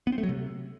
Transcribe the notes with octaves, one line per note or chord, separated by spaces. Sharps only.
B3
C4
A3
F#3
C3